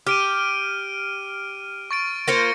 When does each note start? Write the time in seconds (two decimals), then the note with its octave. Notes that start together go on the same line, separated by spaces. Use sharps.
0.07 G4 F6 D7 D#7
1.91 C#6 A6 D7
2.28 A#3 F4 C5 A6 A#6 C#7